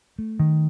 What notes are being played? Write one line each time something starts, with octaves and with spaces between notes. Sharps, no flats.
A3
D#3